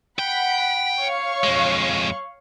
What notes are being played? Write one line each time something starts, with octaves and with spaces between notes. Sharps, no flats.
F#5 G5 B5 B6
C#5 F5 C#6
F2 G#3